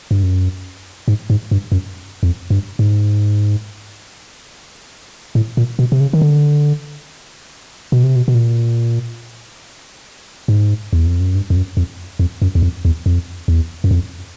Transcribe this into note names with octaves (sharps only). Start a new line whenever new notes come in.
G2
F#2
G#2
G#2
G2
F#2
F2
G2
G#2
A2
A#2
B2
C3
C#3
D#3
D3
B2
C3
B2
B2
A#2
G#2
E2
F2
F#2
G2
F2
F#2
F2
F2
F#2
E2
F2
E2
F2
E2
F#2
F2